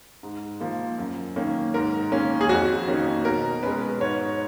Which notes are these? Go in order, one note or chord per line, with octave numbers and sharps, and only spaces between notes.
G#2
F3 A#3
F#2
D#3 A#3 C#4
G#2 A#4
D#3 A#3 C#4
G#4
F2 F#4
D#3 A#3 C#4
B2 A#4
G#3 C#4 B4
G#2 C#5